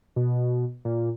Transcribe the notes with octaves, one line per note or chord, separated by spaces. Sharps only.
B2
A#2